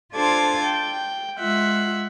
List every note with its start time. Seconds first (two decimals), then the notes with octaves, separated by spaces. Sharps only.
0.13 D4 F4 A4 C5 D6 G#6
0.63 G5
1.39 G#3 F4 E5 F#5